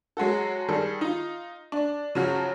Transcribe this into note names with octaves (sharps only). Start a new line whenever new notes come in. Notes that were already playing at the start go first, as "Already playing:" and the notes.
F#3 G#3 F#4 A4
D#3 G3 G#4 A4
D#4 F4
D4
C#3 F3 F#3 F#4 F6